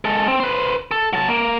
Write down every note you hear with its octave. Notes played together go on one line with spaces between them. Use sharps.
G#3 A4
C4
B4 C5
A4
F#3 A5
A#3